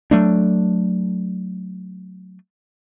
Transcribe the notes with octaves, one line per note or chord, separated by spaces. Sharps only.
F#3 A3 D4